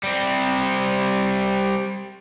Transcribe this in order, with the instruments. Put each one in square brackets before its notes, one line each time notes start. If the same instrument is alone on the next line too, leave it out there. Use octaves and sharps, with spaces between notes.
[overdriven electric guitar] G3 C4